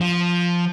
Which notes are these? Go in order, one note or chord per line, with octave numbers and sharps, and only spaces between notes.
F3